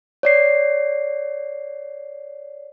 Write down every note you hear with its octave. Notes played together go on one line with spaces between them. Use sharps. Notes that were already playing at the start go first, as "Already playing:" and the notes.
C#5 D5 C7